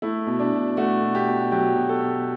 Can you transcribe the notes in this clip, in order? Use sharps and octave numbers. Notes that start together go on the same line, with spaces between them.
A3 E4
B2
D4
B2
A3 F#4
B2
G4
B2
F#3 G4
B2
A4
B2